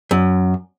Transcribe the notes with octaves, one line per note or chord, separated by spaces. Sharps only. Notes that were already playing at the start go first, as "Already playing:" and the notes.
F#2